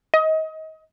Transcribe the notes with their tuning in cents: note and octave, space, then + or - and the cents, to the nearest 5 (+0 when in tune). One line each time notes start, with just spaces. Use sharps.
D#5 +30